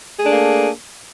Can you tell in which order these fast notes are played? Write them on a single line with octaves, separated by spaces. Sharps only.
G#4 A3 D4 A#3